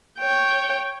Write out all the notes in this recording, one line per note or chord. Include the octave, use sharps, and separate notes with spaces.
C#5 G5